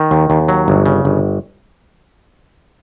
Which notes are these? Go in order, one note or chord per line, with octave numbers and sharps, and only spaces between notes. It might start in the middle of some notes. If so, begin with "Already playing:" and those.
Already playing: D#3
D#2
D#2
F#3
G1
C#3
G1